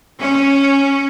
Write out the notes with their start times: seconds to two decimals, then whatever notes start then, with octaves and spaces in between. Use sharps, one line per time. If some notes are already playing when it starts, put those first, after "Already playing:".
0.20 C#4